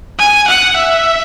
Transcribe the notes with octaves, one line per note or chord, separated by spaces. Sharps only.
G#5
F#5
E5